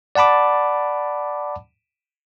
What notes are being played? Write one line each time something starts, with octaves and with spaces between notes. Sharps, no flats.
D5 F#5 A5 B5 D6